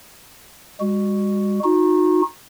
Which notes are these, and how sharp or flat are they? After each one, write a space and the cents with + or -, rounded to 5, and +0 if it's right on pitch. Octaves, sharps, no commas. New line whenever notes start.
G#3 -45 F#4 +0
D#4 +0 F#4 -35